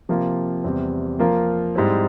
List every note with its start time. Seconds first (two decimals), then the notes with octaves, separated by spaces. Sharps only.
0.09 C3 F3 A#3 F4
0.64 E2 C3 G3 C4
1.19 F3 A#3 F4 A#4
1.75 G#2 G3 C4 E4